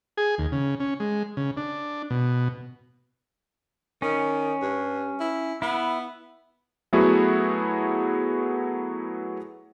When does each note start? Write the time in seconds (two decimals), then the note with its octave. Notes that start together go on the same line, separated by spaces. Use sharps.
0.17 G#4
0.38 D#2
0.52 C#3
0.80 C#4
1.00 G#3
1.37 C#3
1.57 D4
2.10 B2
4.02 D#3 C#4
4.62 G2
5.20 E4
5.62 B3 E4
6.93 F#3 A3 B3 E4 F#4 G#4